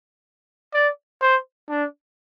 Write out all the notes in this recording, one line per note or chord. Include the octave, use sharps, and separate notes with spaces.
D5
C5
D4